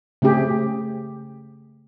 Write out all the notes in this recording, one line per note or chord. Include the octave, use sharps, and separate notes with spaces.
C#3 A3 C4 G4 G#4